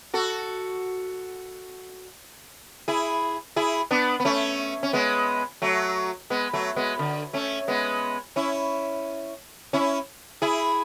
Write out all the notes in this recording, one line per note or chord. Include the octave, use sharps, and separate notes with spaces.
F#4 A4
E4 G#4
E4 G#4
B3 D4
B3
A3 C#4
C#4
G#3 B3
F#3 A3
G#3 B3
F#3 A3
G#3 B3
D3
A3 C#4
G#3 B3
C#4 E4
C#4 E4
E4 G#4